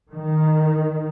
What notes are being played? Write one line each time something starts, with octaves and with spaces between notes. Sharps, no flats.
D#3